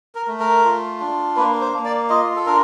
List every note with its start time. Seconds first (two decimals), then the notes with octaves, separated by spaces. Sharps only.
0.15 A#4
0.28 A3
0.40 A#4
0.65 F4
1.00 D4
1.36 A#3 B4
1.61 C5
1.73 A#3
1.85 D5
2.09 F4 D#5
2.36 A4
2.46 D4 A#4